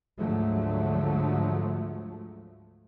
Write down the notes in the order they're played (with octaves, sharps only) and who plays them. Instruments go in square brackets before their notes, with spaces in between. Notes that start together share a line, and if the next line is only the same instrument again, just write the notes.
[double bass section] D2 G#2 D3 F3 F#3 A3